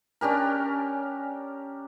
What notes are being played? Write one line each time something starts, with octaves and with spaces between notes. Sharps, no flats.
C#4 D4 G4 A#4